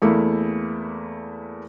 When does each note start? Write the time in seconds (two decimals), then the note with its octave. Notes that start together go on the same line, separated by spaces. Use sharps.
0.02 E2 A3 A#3 E4